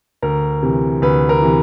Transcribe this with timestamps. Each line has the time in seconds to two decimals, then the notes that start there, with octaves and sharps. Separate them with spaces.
0.22 D2 A#4
0.63 C3 E3
1.02 D2 B4
1.29 A#4
1.42 C3 E3